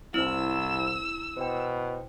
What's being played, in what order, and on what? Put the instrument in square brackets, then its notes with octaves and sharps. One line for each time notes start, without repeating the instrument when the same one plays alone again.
[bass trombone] C2 [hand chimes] C4 C5 [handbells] E4 [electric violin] E6
[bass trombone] B2 [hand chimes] C5 G5